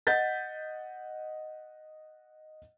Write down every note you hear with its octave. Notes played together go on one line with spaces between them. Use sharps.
D#5 F#5 G6 A6 B6